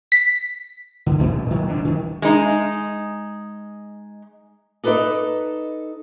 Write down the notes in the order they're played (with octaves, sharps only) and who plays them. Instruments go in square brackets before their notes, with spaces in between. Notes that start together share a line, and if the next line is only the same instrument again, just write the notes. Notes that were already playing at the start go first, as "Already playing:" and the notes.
[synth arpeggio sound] B6
[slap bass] D3
A1 A#2
D#3 F#3
F1 B2 D4
D#3
[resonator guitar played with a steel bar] G#3 D#4
[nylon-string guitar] D#4 A4 B4 C5 D5 D#5